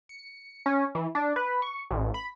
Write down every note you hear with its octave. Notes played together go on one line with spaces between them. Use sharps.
C#7
C#4
E3
D4
B4
C#6
A1
B5